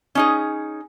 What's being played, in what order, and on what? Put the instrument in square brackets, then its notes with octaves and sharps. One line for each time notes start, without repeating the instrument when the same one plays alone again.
[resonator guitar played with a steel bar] C#4 D#4 G#4